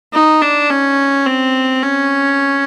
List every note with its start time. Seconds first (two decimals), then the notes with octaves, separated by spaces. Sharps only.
0.13 D#4
0.42 D4
0.70 C#4
1.26 C4
1.83 C#4